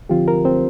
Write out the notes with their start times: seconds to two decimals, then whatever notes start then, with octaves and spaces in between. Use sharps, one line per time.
0.09 D3 F3 C4 F4 G4
0.28 A#4
0.45 C4 C5